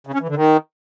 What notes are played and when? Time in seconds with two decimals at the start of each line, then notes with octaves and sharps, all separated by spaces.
0.07 C#3
0.14 C#4
0.21 E3
0.28 D3
0.36 D#3